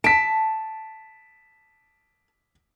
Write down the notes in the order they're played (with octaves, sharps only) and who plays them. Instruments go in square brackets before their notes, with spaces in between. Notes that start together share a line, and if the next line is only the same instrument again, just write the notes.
[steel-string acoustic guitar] A5 [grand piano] B6 D7